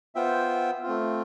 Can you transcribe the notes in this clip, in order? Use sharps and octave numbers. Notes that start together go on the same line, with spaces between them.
B3 F4 C5 E5 G5
A3 C4 F4